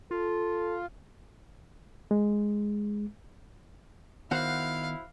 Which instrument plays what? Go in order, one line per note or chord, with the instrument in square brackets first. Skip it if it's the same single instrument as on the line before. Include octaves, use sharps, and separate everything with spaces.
[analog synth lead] F4 [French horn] A4
[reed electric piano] G#3
[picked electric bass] D#3 B3 [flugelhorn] E4 [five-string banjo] F#4 C5 F#5 [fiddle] F5